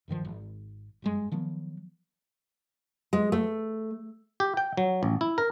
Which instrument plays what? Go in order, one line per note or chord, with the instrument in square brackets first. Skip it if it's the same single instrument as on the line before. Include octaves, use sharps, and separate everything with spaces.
[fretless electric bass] D1 G2 D#3 F3
G#1
F#1 G2 G#3
D#3 F3 F#3 B3
[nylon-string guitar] G#3
A3
[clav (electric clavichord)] G4
G5
F#3
A1
E4
A#4